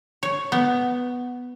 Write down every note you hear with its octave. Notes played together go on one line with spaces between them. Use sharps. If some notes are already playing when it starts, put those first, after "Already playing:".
C#5
B3